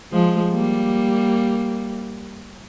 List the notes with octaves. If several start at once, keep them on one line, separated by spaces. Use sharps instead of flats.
F3 G#3
G3 A#3